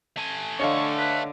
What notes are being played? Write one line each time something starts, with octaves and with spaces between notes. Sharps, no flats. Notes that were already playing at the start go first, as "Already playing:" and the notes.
A3 G#5
D3 C#5 D#5 F5 C#6
B4